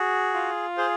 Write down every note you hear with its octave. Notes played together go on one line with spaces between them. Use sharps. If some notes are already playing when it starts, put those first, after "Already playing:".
Already playing: F#4 G#4
F4
G#4 C5